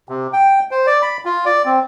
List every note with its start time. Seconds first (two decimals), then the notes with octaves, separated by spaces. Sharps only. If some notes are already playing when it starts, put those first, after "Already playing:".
0.09 C3
0.33 G5
0.71 C5
0.87 D5
1.02 B5
1.25 F4
1.45 D5
1.65 C4